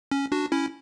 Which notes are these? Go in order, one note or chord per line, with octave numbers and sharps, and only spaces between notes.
C#4
D4 F#4
C#4 E4